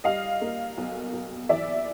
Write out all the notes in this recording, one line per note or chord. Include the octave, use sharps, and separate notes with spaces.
G3 D#5 F5
A#3
B1
B1
E3 D5 E5